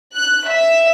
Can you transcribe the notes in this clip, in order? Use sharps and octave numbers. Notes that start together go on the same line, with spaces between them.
F#6
E5